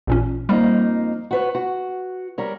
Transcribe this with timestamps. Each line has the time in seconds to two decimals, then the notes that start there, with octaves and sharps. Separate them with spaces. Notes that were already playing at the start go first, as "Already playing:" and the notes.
0.07 A1 A#2 C#4
0.49 F2 G3 A#3 D#4
1.31 F#4 B4 C#5
1.55 F#4
2.38 G3 A#4 C#5